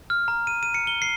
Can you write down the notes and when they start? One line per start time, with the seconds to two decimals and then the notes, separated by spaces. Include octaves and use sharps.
0.10 F6
0.28 A#5
0.47 D#7
0.63 D#7
0.74 C#7
0.87 G7
1.02 C7